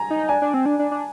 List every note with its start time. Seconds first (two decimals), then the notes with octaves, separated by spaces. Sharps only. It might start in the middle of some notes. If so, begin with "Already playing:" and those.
Already playing: G#5 A#5
0.10 D#4
0.29 D4 G#5
0.42 D4
0.54 C4
0.66 D4
0.79 D4
0.91 D4